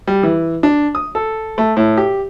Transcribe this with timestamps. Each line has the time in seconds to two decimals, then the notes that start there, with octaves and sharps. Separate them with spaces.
0.07 G3
0.23 E3
0.63 D4
0.95 D#6
1.15 A4
1.58 A3
1.77 A2
1.97 G4